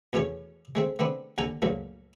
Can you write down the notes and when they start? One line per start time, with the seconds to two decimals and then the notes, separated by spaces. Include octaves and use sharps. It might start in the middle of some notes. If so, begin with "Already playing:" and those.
0.13 E2 B2 A3 C#4 C#5
0.75 G#3 A3 C4
0.99 A3 B3 C4 D4
1.38 D#2 D3 A4 F#5 G#5 A#5
1.62 C#2 G2 A#2 F#3 A3